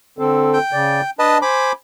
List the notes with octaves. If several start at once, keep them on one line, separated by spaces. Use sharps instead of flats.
D3 C4 A4
G5
C#3 D5
D4 B4 D#5 A5
C5 G#5 B5 D6